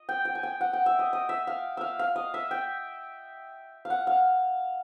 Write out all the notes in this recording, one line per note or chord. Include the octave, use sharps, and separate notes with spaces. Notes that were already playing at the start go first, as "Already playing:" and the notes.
Already playing: D#5
G5
G5
G#5
G5
F#5
G5
E5
D#5
D#5
E5
F5
E5 F5
F5
D#5
E5
G5
F5
F#5
F5